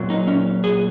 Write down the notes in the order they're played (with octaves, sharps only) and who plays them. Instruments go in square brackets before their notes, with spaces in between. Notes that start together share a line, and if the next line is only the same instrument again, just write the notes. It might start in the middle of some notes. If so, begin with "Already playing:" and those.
Already playing: [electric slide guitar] A#2 F#3
D#4
C#4
G#4